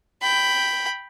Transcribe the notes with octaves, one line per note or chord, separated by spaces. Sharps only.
G5 B5